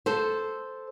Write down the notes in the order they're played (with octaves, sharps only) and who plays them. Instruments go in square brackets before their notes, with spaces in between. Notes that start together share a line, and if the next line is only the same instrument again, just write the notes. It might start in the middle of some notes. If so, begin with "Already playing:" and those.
[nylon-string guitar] A4 C5